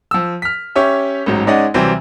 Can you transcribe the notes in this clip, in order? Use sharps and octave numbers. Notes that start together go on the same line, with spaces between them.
F3 E6
F6 B6
C#4 G4 C#5 E5
A1 G#2 F#3
G#3 C#4 D#4 D5 D#5 F#5
C3 E3 F#3 G3 C4